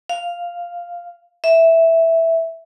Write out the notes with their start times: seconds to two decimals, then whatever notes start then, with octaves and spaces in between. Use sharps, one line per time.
0.09 F5
1.44 E5